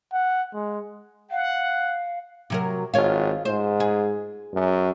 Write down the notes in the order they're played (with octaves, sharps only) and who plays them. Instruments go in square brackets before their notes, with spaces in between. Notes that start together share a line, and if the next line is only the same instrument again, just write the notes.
[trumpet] F#5
G#3
[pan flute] F5 [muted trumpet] F#5
[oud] C3 F#3 A#4
[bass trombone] G#1 [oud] F4 C#5 F5
[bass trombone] G#2 [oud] C5
[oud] G#4
[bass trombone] F#2